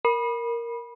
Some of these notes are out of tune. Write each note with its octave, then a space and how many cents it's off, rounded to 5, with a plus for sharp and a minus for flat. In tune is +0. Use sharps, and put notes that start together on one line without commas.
A#4 +0 B5 -20